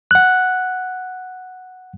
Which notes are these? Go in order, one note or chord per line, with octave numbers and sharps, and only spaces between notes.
F#5 F#6